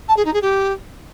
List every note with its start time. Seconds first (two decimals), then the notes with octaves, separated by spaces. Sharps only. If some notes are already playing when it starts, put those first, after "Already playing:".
0.08 A5
0.17 G#4
0.25 D#4
0.33 G#4
0.42 G4